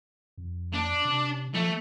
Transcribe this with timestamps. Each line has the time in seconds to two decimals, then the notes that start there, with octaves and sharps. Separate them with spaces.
0.38 F2
0.74 D4
1.05 C3
1.54 F3 A3